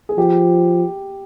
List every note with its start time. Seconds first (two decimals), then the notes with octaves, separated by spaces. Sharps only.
0.09 G#4
0.18 F3 G4